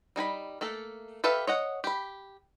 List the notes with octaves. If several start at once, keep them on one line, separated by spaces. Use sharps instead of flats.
G3 D#4 G#5 B5
A3 A#3 A4
G4 A4 B4 E5 F5
C#5 D#5 F#5
G4 B5